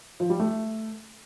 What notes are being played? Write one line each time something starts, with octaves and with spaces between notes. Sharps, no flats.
F3
G3
A3